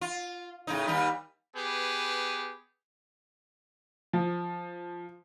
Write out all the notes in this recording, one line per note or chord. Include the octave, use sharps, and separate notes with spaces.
F4
A2 C#3 D#4
D#2 G3 D#4
B3 G4 G#4 B4
F3